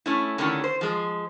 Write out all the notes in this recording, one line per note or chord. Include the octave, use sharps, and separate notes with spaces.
A3 C#4 E4
D3 D#3 A3 C#4 E4 G4
C5
F3 G#3